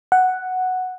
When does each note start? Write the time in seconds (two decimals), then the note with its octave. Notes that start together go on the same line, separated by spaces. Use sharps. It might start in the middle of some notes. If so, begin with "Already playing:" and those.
0.12 F#5